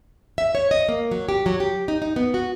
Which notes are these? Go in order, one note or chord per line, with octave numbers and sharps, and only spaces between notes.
E5
C#5
D#5
A#3
F#3
G4
F#3
G4
D#4
D#4
B3
F#4